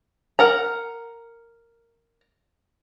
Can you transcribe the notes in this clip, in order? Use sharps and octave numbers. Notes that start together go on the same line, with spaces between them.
A#4 F#5 A#5